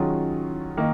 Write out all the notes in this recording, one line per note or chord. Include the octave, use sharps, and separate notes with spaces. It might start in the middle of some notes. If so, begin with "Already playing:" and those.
Already playing: D#3 F#3 C#4 F4 G#4
D#3 A#3 D#4